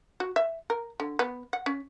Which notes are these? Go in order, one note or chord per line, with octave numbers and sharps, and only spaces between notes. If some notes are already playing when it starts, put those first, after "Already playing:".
F#4
E5
A#4
D3
B3
F#5
C#4